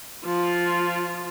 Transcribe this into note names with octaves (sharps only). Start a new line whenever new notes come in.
F3 F4